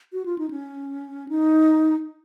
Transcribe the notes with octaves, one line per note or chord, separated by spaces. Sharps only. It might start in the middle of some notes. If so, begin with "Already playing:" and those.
F#4
F4
D#4
C#4
D#4